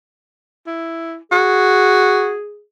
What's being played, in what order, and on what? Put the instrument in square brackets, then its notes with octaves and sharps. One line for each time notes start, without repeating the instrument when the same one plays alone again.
[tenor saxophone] E4
[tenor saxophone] F#4 [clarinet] G#4